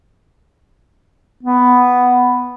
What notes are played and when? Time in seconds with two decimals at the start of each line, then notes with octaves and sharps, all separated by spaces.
1.43 B3